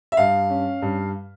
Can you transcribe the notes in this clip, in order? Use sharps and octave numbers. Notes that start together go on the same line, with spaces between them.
E5
G2 F5
C#4
G2